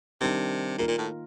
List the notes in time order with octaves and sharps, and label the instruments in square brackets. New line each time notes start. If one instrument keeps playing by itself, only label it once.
[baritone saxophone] C3 [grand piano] D#3 G3 D4
[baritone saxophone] A#2 [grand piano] D#3 A#3 F4 A#4
[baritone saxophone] A#2
A2